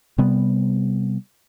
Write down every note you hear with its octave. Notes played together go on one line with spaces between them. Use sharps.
C3 G3 B3